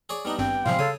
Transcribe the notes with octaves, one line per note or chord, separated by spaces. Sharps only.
G#4 C#5 D5
G3 B3 D4 D#4
G#1 G2 C4 G5
A2 C3 F3 G3 G#3 C4 F5 C6
C#3 A4 C#5 D#6